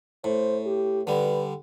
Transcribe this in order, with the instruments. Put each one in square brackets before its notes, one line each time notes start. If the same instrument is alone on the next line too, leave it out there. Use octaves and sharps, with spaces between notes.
[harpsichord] A2 [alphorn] C5
[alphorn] G4
[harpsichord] D3 G3 [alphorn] B4